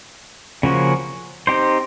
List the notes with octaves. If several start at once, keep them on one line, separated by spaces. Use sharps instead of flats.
C#3 F3 A#3 C#4 F#4
C4 D#4 G4 C5